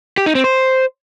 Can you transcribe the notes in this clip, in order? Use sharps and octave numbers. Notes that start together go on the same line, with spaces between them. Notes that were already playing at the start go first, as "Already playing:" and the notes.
G4
D#4
C4
C5